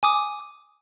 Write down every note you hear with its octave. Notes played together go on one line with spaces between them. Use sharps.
G#5 D6 D#6